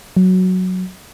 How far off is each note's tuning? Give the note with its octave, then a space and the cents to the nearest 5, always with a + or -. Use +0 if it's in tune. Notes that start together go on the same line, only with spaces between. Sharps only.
F#3 +0